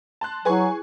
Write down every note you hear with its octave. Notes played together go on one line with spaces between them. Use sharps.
A5 C6 F#6
F#3 E4 G#4 B4 G#5 C#6